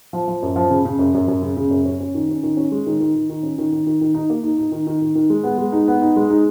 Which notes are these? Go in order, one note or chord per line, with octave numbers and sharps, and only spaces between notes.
F3
F3
F#2
F3
C#3
C#3
F#2
F#2
F#2
C#3
C#3
F#2
C#4
C#4
D#3
C#4
D#3
C#4
G#3
D#3
D#3
D#3
D#3
C#4
D#3
D#3
D#3
D#3
D#4
A#3
D#4
D#4
D#3
D#3
D#3
D#3
G#3
B3
G#3
D#4
B3
D#4
G#3
D#4